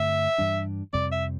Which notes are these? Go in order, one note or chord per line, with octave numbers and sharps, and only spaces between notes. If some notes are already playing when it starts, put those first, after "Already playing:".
Already playing: G2 D3 A3 C4 E5
G2 E3 G3 D4
F2 C3 G3 C4 D5
E5